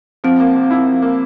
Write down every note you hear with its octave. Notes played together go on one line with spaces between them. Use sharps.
F3 C4
A#3
C3
E4
F3
A#3